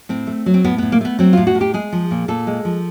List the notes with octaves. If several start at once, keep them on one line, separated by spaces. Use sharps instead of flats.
A2 C4
A3
F#3
C4
A2 B3
A2 B3
A#3
A3 B3
F#3 C4
A2 F4
F#4
A2
G4
G#3 G#4
F3
A#2
A#2 A4
G#3
F3